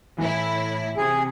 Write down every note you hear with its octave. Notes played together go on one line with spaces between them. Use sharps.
A2 E3 E4
C3 G#4